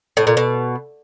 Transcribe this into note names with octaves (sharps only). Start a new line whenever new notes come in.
A2
A#2
B2